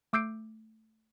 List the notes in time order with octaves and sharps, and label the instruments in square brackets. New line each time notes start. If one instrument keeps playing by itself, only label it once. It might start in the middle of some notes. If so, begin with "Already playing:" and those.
[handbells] A3 D6 E6 G6 C7 D7